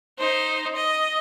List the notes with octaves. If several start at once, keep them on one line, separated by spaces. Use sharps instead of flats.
D#4 C5
D#5